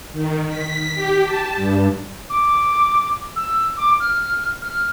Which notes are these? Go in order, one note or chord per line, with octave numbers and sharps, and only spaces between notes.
D#3
B6
G4
A5
G2
D6
E6
D6
F6
F6